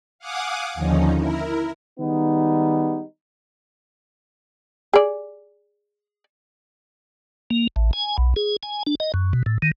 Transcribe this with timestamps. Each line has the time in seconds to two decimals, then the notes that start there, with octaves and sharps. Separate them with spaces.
0.19 F5 F#5 G#5 D6 D#6
0.75 D#2 D3 F3 C#4 D#4
1.16 E4 A#4
2.00 D#3 G3 G#3 B3 D#4
4.94 G#4 D5
7.50 A#3
7.76 A1
7.93 G#5
8.18 B1
8.36 G#4
8.63 G#5
8.87 D4
9.00 D#5
9.14 F#2
9.33 B2
9.46 A2
9.62 D#3